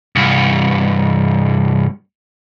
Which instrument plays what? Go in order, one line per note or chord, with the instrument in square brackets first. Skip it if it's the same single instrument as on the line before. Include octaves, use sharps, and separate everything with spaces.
[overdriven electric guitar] C2 G2